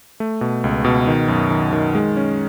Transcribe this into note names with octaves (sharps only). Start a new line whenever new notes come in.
A3
B2
C#2
B2
D#3
F#2
D#3
D#3
G#3
C#4